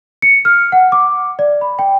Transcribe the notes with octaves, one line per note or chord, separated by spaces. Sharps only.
C#7
F6
F#5
D6
D5
B5
G5